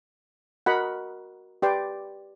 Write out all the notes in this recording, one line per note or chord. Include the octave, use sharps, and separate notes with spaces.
F#4 A#4 D#5 F#5 B5
G4 B4 D5 G5 C6